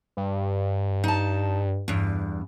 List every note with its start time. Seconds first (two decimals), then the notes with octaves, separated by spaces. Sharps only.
0.17 G2
1.04 D#4 A5
1.88 E2 G2